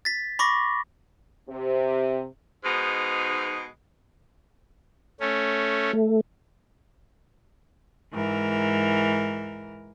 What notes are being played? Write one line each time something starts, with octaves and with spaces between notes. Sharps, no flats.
A6 B6
B5 C#6 D6 A#6
C3
G#2 B2 G#3 D#4
A3 C#4
A3
G#2 E3 A#4